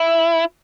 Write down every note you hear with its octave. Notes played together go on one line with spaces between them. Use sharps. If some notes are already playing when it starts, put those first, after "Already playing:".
Already playing: E4